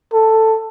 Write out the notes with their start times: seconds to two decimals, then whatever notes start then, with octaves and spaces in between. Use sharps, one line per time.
0.14 A4